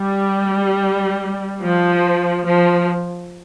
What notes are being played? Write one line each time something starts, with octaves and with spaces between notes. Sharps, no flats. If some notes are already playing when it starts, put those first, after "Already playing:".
Already playing: G3
F3
F3